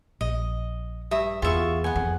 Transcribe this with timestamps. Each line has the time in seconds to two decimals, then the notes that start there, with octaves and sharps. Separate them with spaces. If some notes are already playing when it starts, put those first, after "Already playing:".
0.21 A#1 D#5
1.11 G2 E5 D#6
1.42 E2 B3 F4 G#4 E5 C#6
1.84 B3 F#5 G#5
1.96 F2